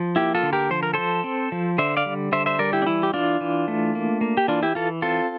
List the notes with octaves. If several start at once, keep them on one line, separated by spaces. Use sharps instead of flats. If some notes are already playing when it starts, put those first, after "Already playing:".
Already playing: F3
A#3 E4 G4
F4 A4
D3
G4 A#4
F3 C5
A#4
F3 A4 C5
C4
F3
D3 C5 E5
D5 F5
G3
D3 C5 E5
C5 E5
G3 A#4 D5
E4 G4
D4
E3 E4
G4
E3 D4 F4
E3
A3
A#3
A#3
G4
E3 D4 F4
E4 G4
E3 F4 A4
C4 F4 A4